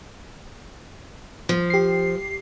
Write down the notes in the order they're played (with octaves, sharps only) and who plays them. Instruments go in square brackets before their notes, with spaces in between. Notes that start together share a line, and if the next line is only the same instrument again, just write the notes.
[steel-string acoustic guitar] F3
[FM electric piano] G4 C7